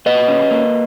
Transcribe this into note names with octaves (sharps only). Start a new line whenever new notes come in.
A#2 B4 D#5
C#4
A#3